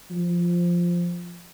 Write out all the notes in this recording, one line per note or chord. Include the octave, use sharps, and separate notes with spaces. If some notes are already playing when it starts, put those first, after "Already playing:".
F3